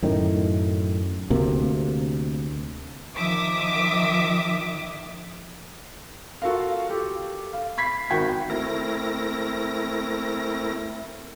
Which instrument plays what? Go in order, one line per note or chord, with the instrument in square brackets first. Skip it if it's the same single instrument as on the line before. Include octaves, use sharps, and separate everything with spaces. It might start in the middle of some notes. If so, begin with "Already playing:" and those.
[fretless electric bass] F#2 A2 D#3
D2 C3 A#3
[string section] D#3 F3 E5 D6 D#6
[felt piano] F4 F#4 A4 A#4 F5
G4 A4
F5
B5 G#6 B6 C7
G#1 D#3 F#4 G5 G#6
[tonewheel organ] A3 C4 E4 A#4 A#6